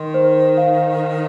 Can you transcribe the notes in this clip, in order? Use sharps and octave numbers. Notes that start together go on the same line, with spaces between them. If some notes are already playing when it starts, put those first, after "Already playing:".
Already playing: D#3 C6
C5
F5